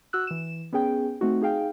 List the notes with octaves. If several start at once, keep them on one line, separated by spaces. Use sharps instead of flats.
F#4 E6 F#6
E3 E7
B3 C#4 G#4 G5
A3 C4 D#4 F#4
D#4 G#4 F5 G5